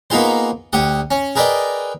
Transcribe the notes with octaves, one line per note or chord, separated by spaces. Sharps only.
A#3 B3 D#4 F4 G#4 C5
D2 G4 F#5 D#6
C#4
G#4 A#4 B4 D5 D#5 G5